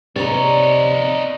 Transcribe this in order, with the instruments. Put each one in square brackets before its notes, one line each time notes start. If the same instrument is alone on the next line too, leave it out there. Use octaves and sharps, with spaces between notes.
[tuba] C3 [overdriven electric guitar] D#4 C#5 [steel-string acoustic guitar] D5 A#5